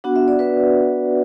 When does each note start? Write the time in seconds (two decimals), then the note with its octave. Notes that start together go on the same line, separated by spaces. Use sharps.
0.04 B3 D4 F#4 F#5
0.16 E5
0.28 D5
0.39 B4 E5